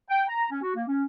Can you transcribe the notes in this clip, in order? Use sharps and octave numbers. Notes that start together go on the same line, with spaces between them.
G5
A#5
C#4
F#4
A#3
C#4